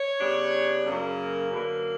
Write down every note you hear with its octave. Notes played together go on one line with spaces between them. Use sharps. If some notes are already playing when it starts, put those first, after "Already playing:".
Already playing: C#5
C#3 G3 B3 D4
F#2 C#3 F#3 A#3
F#2 D3 A#3 B4